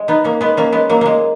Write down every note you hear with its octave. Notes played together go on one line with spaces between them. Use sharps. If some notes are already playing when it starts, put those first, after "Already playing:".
Already playing: G#3
B3 D#4
A#3 C#4
G#3 B3
A#3 C#4
G#3 B3
F#3 A#3
G#3 A#3